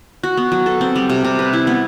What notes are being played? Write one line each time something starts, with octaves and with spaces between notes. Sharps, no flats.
F#4
B3
F#3
A4
C4
G3
C3
C3
B4
E4
B3